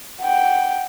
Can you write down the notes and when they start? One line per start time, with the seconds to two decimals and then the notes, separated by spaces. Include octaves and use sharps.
0.21 F#5 G5